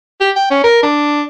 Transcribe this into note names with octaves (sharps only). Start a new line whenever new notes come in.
G4
G5
C#4
A#4
D4